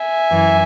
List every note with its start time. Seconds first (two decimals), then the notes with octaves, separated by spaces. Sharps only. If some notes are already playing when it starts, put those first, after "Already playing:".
Already playing: E5 G#5
0.31 F#2 E3